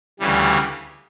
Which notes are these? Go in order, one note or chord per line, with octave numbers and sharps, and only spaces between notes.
D2 C#3 E3 G3